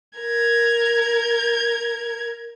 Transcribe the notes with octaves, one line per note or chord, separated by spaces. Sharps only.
A#4 G#6